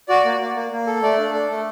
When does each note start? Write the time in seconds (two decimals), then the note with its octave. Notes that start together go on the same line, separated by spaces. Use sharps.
0.08 F#4 D5
0.25 A#3
0.40 A#3
0.55 A#3
0.71 A#3
0.87 A4
1.03 A3 D5
1.18 D4
1.33 A4
1.50 A3